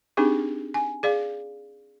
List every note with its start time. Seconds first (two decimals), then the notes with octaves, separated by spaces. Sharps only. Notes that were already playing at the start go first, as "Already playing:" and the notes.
0.17 C4 D4 D#4 G4 G#4
0.74 G#5
1.03 G#4 D5 F5